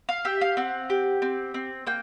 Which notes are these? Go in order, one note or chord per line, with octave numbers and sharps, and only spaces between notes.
F5
G4 E5
F5
C4 F#5
G4
C4
C4
A#3 G5